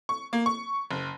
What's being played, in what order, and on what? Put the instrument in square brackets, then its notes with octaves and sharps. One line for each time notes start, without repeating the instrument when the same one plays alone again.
[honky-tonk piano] C#6
A#3
C#6
F#1